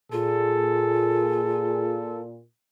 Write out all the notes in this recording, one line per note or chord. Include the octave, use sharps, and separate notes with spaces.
A#2 F4 G#4 A4